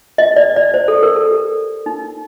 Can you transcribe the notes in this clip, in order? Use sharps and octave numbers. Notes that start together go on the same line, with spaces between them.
D#5
D5
D5
C5
A4
A#4
A4
G4
D#4